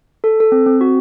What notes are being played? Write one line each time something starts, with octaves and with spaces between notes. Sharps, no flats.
A4
A4
C4
C4
F#4